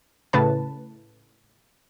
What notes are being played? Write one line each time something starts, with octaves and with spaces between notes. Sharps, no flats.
A2 C#3 B4 A5